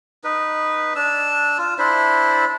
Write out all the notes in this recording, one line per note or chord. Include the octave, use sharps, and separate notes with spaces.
D#4 B4
D4 E6
F4
D4 E4 C5 E5